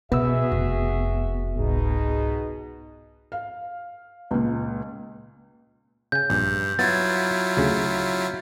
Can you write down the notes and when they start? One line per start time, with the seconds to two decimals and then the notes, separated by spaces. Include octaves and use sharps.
0.12 B2 B3 F#4 G#4 E5 E6
0.52 F1 F2
1.57 C2 G#2 B2 D#4 G#4
3.32 F5
4.31 C#2 A#2
6.12 C#3 G#5 G6
6.30 A#1 G2 G#5
6.79 F#3 B3 E4 F4 G#6 A6
7.57 D2 C#3